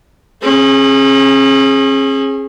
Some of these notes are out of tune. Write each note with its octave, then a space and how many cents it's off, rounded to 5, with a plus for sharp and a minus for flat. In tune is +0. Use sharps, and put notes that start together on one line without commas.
C#4 -40 G#4 +0